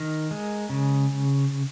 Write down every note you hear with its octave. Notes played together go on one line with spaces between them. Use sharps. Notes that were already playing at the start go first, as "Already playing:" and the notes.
Already playing: D#3 A#4
G#3
C#3